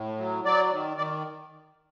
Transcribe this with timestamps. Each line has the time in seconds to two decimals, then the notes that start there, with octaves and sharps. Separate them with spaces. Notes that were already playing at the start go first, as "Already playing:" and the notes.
Already playing: A2
0.18 F#3
0.45 F#3 D5
0.71 D#3
0.97 D#3 D5